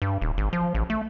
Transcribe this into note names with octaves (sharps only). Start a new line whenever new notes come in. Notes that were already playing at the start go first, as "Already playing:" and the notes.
G2
D#1
G#1
F3
A1
A3